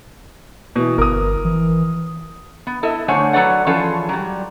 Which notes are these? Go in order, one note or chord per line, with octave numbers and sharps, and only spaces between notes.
B2 E3
G1 A#4 D#6
E3
B3
E4 A4 D#5
D3 A3 C5 C#5 F#5 G#5
F#3 A4 B4 C#5 D5 F#5
E3 F3 C#4 F4 G#4 A4
F#3 G3